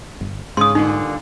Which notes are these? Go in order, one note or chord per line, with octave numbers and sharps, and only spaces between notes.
G1
G#2 C#3 C6 D#6
G2 A#2 D3 D#4